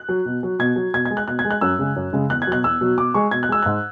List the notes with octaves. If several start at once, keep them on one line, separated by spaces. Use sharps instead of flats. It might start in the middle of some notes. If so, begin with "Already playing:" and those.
Already playing: F#6
F#3
B2
F#3
B2 G#6
F#3
B2 G#6
G#6
G#3
F#6
B2 F#6
G#6
G#3
F#6
F#2 E6
C#3 G#3
F#2
C#3 G#3
E2 F#6
G#6
B2 F#3 F#6
E2 E6
B2 F#3
B2 D6
G#3 C#6
B2 G#6
F#6
G#3 E6
G#2 F#6